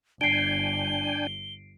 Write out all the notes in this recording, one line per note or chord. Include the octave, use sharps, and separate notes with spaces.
G1 D4 G5 G#5 C7 D7 G7